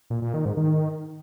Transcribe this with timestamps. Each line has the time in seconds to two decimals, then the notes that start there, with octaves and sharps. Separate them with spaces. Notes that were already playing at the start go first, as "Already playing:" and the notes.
0.10 A#2
0.22 A#2
0.34 D#3
0.45 G#2
0.57 D#3